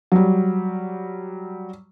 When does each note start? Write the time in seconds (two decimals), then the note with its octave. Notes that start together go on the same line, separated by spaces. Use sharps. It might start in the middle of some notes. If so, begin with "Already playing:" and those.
0.12 F#3 G3